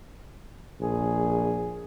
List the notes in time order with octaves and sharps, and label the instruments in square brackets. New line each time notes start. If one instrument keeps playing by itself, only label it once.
[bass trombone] A#1 [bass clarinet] G#4